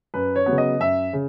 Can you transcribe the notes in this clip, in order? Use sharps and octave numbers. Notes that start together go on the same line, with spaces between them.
F#2 B4
C#5
C#3 F#3 B3
D#5
F#2 E5
C#3